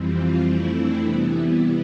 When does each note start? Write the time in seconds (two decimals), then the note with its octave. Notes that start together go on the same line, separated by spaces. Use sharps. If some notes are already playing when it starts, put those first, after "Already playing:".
Already playing: F2 E3 G3 C4
0.17 F4
0.46 F2 E3 A3 C4 E4
0.75 D4
1.03 C3 E3 G3 B3 E4